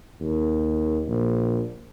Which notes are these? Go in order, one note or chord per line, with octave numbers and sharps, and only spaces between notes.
D#2
A#1